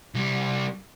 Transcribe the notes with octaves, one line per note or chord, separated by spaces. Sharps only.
C2 G3